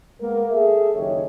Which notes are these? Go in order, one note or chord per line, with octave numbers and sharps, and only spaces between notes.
G#3 A#3 B3 A#4
G#4 A4 E5
F#1 D#3 G4 C#5